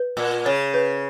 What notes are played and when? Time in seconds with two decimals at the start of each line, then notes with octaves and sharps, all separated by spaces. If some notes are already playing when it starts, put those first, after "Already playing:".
Already playing: B4
0.17 A#2
0.46 C#3 C#5
0.74 B4